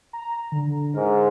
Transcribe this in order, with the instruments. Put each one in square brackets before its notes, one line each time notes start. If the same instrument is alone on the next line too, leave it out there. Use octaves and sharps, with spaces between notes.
[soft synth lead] A#5
D3
[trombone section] G#2 [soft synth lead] A#4